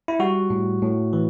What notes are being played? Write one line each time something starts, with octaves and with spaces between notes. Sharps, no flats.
E4
G3 F#4
A2
A2
E3